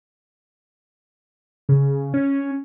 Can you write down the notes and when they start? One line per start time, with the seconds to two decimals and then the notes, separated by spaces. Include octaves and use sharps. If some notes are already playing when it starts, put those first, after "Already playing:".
1.69 C#3
2.14 C#4